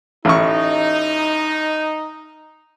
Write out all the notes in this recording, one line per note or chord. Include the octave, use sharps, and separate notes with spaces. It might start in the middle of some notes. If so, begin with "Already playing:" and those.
A1 D#4 C#6